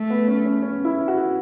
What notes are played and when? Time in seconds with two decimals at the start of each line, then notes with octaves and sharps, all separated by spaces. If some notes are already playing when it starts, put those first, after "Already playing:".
Already playing: A3
0.10 B3
0.28 C#4
0.45 C#4
0.62 C#4
0.85 E4
1.08 F#4